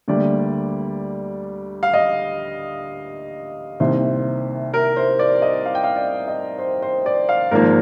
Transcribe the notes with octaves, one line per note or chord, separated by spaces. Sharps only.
D2 D3 G3 A#3 D5
F5
D#5
C2 C3 D#3 A#3 C5
A#4
C5
D5
D#5
F5
G5
F5
D5
D#5
C5
C5
D5
F5
G#1 G#2 F3 A#3 A#4